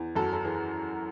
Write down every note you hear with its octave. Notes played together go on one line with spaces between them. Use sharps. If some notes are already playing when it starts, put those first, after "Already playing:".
Already playing: E2
F#2 F#4 A4
A4
E3 G#4